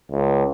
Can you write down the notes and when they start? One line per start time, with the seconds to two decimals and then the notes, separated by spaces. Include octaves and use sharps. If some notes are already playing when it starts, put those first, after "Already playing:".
0.12 C#2